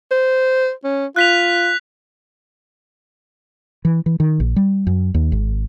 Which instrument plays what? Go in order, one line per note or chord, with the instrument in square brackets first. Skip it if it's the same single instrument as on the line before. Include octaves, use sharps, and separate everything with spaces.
[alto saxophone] C5
C#4
[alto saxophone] F4 [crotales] F#6 B6 F7
[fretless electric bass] E3
E3
D#3
A#1
G3
F#2
D#2
G#1